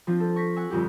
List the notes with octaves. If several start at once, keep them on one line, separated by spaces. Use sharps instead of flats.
F3 C4 D4 F4
A4
C#6 A#6 B6
F#5 G#5 E6
G1 F2 G4